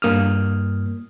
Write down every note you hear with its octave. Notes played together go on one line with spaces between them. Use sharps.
G2 A#3 D#6 F6